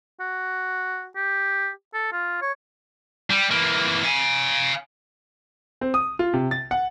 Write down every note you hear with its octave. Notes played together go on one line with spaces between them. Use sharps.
F#4
G4
A4
F4
C#5
G3
E3 A#3
F5 G#5
C4
D#6
F4
C3
A6
F#5